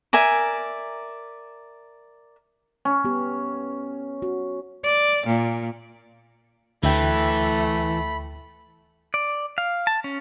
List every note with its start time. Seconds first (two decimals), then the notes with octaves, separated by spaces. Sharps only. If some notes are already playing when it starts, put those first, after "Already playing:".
0.13 A#4 D5 E5 G#5
2.85 C#4
3.04 B3 G4
4.22 F#4
4.83 D5
5.25 A#2
6.83 D2 E3 A3 E5 G5 B5
9.14 D5
9.58 F5
9.87 A5
10.04 C#4